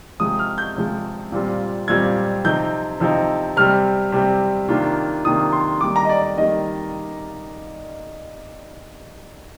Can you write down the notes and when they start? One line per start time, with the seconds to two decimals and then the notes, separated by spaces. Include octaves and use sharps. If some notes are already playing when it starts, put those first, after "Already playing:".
0.20 C3 F3 G#3 D#6
0.39 F6
0.58 G6
0.76 C3 F3 G#3
1.32 A#2 G3 C4 F4
1.88 A#2 G3 C4 F4 G#6
2.44 C3 F3 C4 D#4 G6
3.00 C3 F3 C4 D#4
3.57 C3 G3 C4 F6
4.12 C3 G3 C4
4.68 C3 D#3 A#3 D4 F4
5.24 C3 D#3 A#3 D4 F4 D#6
5.53 C6
5.81 D#3 G3 A#3 D6
5.96 A#5
6.05 D#5
6.09 D5
6.23 D5
6.37 D#3 G3 A#3 D#5